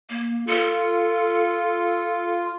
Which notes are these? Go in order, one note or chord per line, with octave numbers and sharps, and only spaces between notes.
A#3
F4 A4